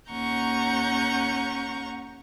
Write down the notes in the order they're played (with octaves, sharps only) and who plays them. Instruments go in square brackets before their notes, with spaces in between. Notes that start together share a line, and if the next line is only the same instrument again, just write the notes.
[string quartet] D#2 C#4 F#5 A#5 C#6 G6